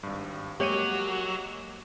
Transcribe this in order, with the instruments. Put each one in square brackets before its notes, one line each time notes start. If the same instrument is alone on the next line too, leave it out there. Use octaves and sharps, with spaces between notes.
[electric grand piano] G#1 G2
[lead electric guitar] F#3 [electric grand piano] G#3 A#3 D#7 [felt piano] G4 C#5